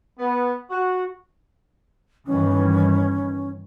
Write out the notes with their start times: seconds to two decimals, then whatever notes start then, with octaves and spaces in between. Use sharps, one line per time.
0.19 B3
0.70 F#4
2.27 G1 D#3 E3 C#4